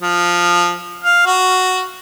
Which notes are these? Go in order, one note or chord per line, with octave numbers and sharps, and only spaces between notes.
F3
F5
F#4